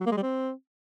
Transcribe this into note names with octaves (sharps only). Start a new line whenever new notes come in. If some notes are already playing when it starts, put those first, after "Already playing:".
F#3
A#3
G#3
G3
C4